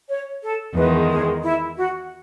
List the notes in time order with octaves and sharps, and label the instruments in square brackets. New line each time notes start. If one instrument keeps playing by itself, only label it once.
[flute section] C#5
A4
[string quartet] E2 D#3 G#3 [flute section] B4
[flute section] G#4
E4
F#4